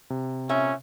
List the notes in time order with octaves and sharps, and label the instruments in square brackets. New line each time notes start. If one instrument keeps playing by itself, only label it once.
[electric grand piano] C3
[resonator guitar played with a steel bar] A#2 E5 [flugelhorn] C#4